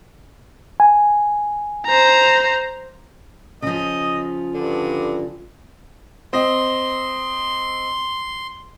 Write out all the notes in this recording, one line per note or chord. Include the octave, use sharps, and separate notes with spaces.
G#5
C5 A#5
C#3 F3 D#5
G2 D3
C4 D#5 C6